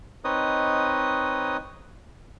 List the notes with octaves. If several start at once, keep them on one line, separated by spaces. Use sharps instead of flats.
C4 D#4 B4 C#5 D#5 D#6